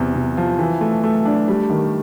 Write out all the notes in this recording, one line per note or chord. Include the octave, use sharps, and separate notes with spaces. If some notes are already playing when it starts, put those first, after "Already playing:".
Already playing: E2 C3
C3
F3
E3
A3
A3
D4
G3
D#3